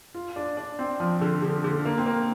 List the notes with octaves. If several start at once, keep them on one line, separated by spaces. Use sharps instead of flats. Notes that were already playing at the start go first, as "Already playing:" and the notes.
F4
D4
D4
C4
F3
D3
D3
D3
A#3
C4
A#3